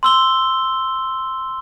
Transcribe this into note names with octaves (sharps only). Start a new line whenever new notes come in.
C6 E6 G7